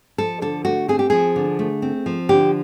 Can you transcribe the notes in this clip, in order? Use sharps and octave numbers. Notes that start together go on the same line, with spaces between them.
F3 A4
D3 A4
A3 F#4
C4 G#4
G4
F3 G#4
D3
A3
C4
F3
D3 G4